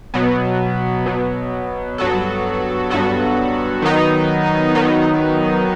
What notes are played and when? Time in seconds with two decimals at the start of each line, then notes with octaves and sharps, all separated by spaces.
0.14 B2 F#3 B3
1.06 B2 F#3 B3
1.98 G2 F#3 B3 F#4 A4
2.90 G2 F#3 B3 F#4 A4
3.82 D#3 F#3 B3 D#4
4.75 D#3 F#3 B3 D#4